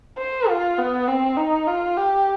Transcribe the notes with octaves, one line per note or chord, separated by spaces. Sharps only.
C5
F4
B3
C4
D#4
F4
G4